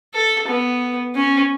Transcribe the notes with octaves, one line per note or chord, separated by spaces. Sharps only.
A4
B3
C#4